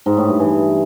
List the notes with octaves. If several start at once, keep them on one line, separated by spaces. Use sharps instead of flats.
G#2
A2
G2
E3